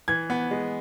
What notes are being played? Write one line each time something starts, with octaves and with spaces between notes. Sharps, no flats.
E3 G#6
B3
G#3